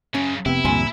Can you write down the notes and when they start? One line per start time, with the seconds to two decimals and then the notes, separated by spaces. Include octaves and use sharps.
0.15 F#2 C#3 C#4
0.46 F1 C3 B3 E4 G5
0.65 D2 G2 A#2 F3 G#5 C6